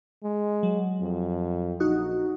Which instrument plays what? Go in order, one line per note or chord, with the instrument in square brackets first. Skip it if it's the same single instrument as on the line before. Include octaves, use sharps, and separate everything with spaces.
[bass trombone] G#3
[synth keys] F#3
[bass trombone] F2
[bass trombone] A#1 [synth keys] D#4 F#4